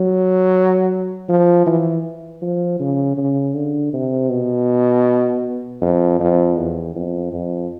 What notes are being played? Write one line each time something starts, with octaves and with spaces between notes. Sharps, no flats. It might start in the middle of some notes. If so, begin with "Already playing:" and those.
Already playing: F#3
F3
E3
F3
C#3
C#3
D3
C3
B2
F2
F2
E2
F2
F2